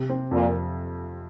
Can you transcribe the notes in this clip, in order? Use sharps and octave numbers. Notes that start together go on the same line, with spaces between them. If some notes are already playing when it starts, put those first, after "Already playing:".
Already playing: C3
C4
F2 A#2